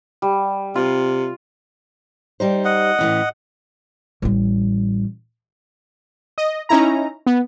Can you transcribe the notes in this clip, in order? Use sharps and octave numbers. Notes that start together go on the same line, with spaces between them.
G3
C3 F4
G3 D#4 C5
D#5 F#5
A2 E3 C#4
A1 G3
D#5
C#4 D#4 E4 A#5
B3